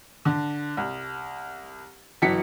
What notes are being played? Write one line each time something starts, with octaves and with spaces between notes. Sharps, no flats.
D3
C2
G1 E3 F#3 B6 C#7